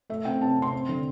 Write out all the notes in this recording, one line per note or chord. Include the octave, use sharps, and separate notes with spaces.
A3 E5
C4 G5
C3 A5
C3
C6
C4
D3